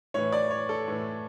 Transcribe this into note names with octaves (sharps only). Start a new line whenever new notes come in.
A2 E3 C#5
D5
C#5
A4
A2 E3